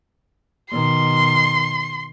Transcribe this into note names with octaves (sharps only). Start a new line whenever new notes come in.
B2 D#3 C6